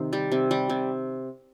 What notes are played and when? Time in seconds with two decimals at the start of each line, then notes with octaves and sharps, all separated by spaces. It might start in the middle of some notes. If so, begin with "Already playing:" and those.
Already playing: C3 D#3
0.13 G3
0.32 C3
0.51 G3
0.70 C3